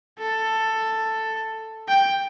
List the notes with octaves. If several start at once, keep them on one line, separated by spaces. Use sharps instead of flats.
A4
G5